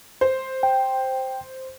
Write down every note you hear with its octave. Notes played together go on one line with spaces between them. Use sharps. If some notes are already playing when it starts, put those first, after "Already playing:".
C5
G5